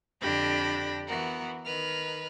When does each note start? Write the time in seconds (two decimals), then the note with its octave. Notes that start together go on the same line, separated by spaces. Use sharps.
0.21 F2 D3 D4 G4 B5 A#6
1.06 E3 B3 F#4 A#4
1.65 D#3 B4 F6